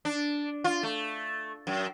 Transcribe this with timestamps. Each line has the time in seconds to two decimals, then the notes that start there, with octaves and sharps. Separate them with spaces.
0.05 D4
0.64 F4
0.83 A3
1.67 F#2